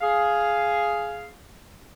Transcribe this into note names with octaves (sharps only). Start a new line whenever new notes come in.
G#4 F5